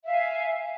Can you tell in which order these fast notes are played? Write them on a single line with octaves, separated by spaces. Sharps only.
E5 F5 G#5